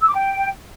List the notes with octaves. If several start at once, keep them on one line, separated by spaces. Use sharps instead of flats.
E6
D6
G5